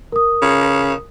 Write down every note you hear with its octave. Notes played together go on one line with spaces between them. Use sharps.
A#4 D#6
C#3